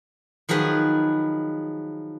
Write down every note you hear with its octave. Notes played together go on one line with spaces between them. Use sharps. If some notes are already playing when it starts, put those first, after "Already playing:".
D#3 F3 F#3 G#4 B4